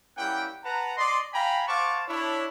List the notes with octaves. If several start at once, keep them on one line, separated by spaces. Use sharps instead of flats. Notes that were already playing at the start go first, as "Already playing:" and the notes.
G3 A#3 C#4 E4 F#5 G5
B4 F#5 A5 A#5
D5 D#5 C6
F5 G5 G#5 A#5 B5
C5 F5 F#5 A5 C#6 D6
D4 E4 C#5